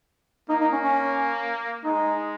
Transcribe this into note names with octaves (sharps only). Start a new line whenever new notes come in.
A#3 D#4
D#4
C#4
C#4
G#3 D#4